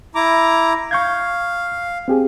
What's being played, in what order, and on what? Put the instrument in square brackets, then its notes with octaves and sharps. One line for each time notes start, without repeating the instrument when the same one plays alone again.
[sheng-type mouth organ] E4 A#5 D6
[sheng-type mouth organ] F5 [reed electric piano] C#6 G6 G#6
[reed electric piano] C4 G4 G#4